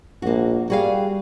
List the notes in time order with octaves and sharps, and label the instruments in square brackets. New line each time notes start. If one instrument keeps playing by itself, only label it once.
[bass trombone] A#1 [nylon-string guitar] A#3 F#4
[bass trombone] G3 [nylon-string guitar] F#4 G#4 F5